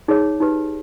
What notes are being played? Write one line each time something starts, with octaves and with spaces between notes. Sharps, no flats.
D#4 G#4 C#5
D#4 G4 B4